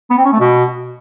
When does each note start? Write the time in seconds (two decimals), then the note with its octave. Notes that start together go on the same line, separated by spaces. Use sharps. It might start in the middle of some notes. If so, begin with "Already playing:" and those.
0.11 B3
0.18 C4
0.25 C#4
0.33 A3
0.40 B2